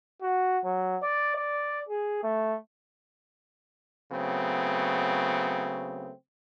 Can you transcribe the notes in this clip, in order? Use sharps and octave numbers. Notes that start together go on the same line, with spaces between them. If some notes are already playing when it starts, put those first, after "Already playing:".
F#4
F#3
D5
D5
G#4
A3
C#3 F#3 A3 B3 C4